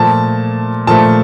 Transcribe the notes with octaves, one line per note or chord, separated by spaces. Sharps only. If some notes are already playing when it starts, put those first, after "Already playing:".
Already playing: A#2 F3 A3 A5
A#2 F3 A3 A5